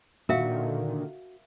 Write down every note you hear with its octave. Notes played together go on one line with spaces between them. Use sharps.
A#2 D3 D#3 F#4 A#4 E5 F5